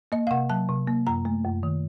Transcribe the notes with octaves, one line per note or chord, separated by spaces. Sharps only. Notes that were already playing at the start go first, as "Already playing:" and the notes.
A#3 D#5
F5
C3 F#5
F#3 A5
C3
A#3
F#2 A#5
A3
F#2
D#3